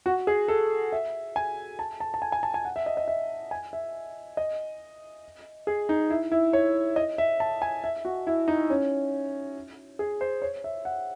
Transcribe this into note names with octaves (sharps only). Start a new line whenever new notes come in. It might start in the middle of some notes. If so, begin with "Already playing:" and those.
F#4
G#4
A4
E5
G#5
A5
A5
A5
G#5
G#5
A5
G#5
F#5
E5
D#5
D#5
E5
G#5
E5
D#5
G#4
D#4
E4
E4
C#5
D#5
E5
A5
G#5
E5
F#4
E4
D#4
C#4
G#4
C5
C#5
E5
F#5